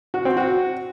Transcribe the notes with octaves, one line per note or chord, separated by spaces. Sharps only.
F#4
C4
F#4